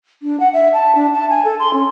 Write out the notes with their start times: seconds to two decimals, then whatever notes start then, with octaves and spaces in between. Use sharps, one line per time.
0.22 D4
0.40 F#5
0.53 E5
0.73 A5
0.95 D4
1.13 A5
1.29 G#5
1.44 A4
1.59 C6
1.73 C#4